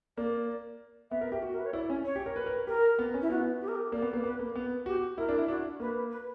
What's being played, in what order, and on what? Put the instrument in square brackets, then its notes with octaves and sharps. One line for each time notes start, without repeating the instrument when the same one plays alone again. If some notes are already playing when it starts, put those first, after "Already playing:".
[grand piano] A#3 [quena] D5
[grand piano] B3 [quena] E5
[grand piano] A#4
G4
F#4
[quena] A#4
B4
C#5
[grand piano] E4 [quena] D5
[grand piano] C#4
[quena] C#5
[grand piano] G4
A#4
B4
A#4
[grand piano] G4 [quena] A#4
[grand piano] B3
C#4
[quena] E4
[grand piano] B3 [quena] F#4
[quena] G4
A#4
G4
[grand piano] A#3 [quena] D5
[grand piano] B3
A#3
[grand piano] B3 [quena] B4
[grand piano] A#3
B3
[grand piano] F#4 [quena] G4
[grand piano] E4 [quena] A#4
[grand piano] D4
E4
[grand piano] D4 [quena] F#4
[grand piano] A#3 [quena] B4
[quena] B4